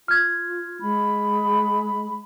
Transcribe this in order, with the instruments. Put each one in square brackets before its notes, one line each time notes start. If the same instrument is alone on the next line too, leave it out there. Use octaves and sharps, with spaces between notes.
[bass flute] F4 [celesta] F6 G#6
[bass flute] G#3 [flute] B5